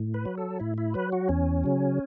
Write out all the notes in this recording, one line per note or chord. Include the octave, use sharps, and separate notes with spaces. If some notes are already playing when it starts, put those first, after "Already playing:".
Already playing: A2
B4
F#3
A4
A2 E4
E4
F#3 B4
F#4
E2 C#4
C#3 F#3